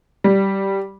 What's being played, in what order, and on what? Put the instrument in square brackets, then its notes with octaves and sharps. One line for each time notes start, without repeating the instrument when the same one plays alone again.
[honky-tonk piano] G3